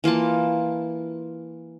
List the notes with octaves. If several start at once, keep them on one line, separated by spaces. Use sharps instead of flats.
E3 A#3 F4 A5